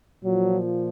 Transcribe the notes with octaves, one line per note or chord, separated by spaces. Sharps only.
A#2 F3 F#3